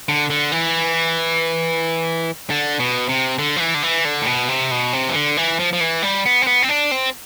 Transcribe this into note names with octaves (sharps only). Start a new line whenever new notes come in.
D3
D3
E3
D3
B2
C3
D3
F3
E3
D3
E3
D3
A2
B2
C3
B2
C3
E3
D3
E3
F3
F3
E3
G3
B3
C4
B3
C4
D4
C4